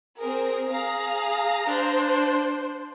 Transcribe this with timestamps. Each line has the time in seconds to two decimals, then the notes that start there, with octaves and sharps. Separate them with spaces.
0.20 C4 G#4 A#4
0.71 G#4 F5 A#5
1.67 D4 C5